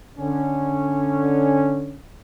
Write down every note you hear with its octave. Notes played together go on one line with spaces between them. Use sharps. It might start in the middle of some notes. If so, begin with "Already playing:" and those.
D3 C#4